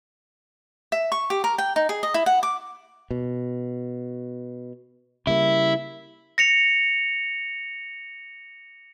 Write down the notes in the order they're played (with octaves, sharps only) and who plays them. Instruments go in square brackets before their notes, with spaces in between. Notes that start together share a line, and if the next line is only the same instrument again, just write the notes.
[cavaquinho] E5
C#6
G4
A#4
G5
D#4
G#4
D#5
E4
F#5
D6
[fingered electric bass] B2
[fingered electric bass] C#3 G3 A#3 [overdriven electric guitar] E4
[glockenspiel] A#6 C#7 F7